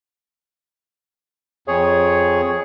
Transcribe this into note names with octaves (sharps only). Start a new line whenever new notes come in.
F2 G#4 C#5